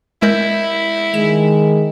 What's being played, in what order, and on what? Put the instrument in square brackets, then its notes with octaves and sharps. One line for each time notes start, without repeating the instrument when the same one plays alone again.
[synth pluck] G#3 A#4 G6 [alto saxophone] E4
[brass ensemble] D#3 G#3 [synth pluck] E7